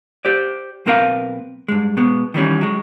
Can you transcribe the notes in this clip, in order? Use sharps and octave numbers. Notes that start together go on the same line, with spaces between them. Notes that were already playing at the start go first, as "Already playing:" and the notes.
G4 C5 D5
B1 A#3 C4 A#4 B4 F5
G2 G#3
B2 G#3 B3
D#3 E3 G3 C#4
F#3 G#3